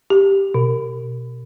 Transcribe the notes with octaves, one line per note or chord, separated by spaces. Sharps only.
G4
B2